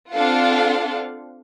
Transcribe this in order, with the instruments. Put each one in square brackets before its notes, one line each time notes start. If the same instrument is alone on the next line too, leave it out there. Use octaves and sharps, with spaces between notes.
[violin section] C4 D4 F4 A4 F5 F#5